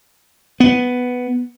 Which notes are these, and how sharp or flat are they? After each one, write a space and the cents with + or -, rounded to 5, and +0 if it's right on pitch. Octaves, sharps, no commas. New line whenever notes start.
B3 +5